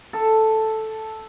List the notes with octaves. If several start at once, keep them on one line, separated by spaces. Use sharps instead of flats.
A4